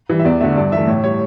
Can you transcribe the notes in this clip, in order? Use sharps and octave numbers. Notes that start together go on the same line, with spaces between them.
E3 G3
E5
E2 D5
D3 A3 E5
G2 D5
E3 A3 E5
A2 C#5
G3 C#5